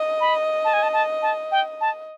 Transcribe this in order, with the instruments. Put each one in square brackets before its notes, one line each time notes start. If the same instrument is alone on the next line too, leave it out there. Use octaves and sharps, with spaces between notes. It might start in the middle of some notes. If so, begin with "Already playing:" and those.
Already playing: [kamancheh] D#5
[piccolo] B5
A5
G#5
A5
A5
A5
G5
A5